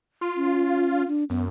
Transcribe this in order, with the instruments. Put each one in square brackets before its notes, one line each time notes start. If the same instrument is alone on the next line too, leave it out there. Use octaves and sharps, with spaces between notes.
[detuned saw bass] F4
[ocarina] C#4
D4
[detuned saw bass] F#2 [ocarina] B3